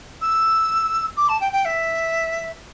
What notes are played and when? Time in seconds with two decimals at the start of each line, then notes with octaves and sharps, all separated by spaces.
0.21 E6
1.17 D6
1.28 A5
1.40 G5
1.52 G5
1.65 E5